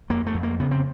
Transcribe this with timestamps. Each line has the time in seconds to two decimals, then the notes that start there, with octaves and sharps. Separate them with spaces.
0.10 F2 A#3
0.26 A3
0.34 F2
0.43 A#3
0.60 C#3 B3
0.71 C4